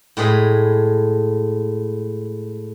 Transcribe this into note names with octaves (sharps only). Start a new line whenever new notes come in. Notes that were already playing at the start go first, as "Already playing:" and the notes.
A2 G#3 G#4 B4